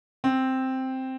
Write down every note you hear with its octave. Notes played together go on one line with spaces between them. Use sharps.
C4